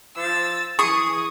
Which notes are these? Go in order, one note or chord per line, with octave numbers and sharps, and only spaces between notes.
F3 E6 A6
E3 G#4 C#6 D#6